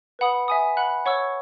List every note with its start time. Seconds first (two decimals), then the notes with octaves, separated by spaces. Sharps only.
0.19 B4 F#5 B5 D#6
0.48 E5 G#5 D#6
0.77 F#5 B5 F#6
1.05 C#5 F#5 C#6 E6